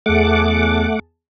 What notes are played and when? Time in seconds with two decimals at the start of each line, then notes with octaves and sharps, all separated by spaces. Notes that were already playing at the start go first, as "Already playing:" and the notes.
0.06 E2 A3 G#4 F#5 A5 D6